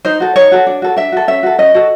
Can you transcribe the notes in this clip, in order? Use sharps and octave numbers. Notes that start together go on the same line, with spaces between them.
D#4 C5
F#4 A4
D#4 C#5
F#4 A4
D4
F#4 A4
D4 E5
F#4 A4
C#4 E5
F#4 A4
C#4 D#5
F#4 A4